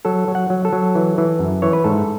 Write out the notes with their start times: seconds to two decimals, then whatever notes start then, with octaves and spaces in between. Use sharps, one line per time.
0.05 F#3 A4
0.28 F#3
0.35 F#5
0.50 F#3
0.65 A4
0.73 F#3
0.95 E3
1.18 E3
1.39 F#2
1.62 E3 C#5
1.73 B4
1.84 G#2 A4